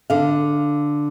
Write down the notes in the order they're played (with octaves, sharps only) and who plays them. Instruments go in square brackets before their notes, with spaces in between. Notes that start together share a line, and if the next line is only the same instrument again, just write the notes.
[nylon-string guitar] D3 F5